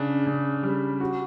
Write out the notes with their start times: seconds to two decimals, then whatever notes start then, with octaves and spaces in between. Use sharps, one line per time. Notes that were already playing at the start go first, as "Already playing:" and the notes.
Already playing: C#3 D4
0.26 C#3
0.63 G3
1.00 F#4